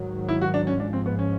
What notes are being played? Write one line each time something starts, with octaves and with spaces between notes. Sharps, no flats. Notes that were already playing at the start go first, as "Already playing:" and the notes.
Already playing: G#2 D#3 F#3
E4
F#4
D4
C#4
G#2 F3 G#3 D4
C4
B3
C#4